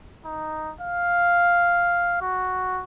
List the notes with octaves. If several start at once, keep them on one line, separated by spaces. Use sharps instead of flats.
D#4
F5
F#4